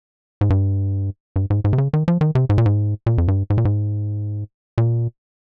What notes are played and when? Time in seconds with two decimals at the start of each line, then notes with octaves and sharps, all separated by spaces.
0.41 G#2
0.50 G2
1.36 G2
1.50 G#2
1.64 G#2
1.73 C3
1.78 C#3
1.93 D#3
2.08 F3
2.21 D#3
2.35 C3
2.49 G#2
2.58 A#2
2.66 G#2
3.06 A#2
3.18 F2
3.28 G2
3.50 G#2
3.58 A#2
3.65 G#2
4.78 A#2